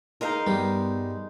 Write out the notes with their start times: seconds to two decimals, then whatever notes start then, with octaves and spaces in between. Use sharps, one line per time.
0.21 G#3 D#4 A#4 D#5 F5
0.47 G2 G3 B3